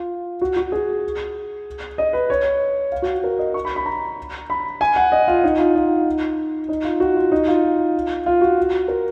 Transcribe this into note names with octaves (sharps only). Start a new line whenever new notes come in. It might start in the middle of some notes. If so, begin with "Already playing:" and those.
Already playing: F4
F#4
F#4
G#4
D#5
B4
C#5
F5
F#4
A#4
D#5
C#6
B5
B5
A#5
B5
G#5
F#5
D#5
F4
D#4
F4
D#4
D#4
F4
F#4
F4
D#4
F4
F4
F#4
A#4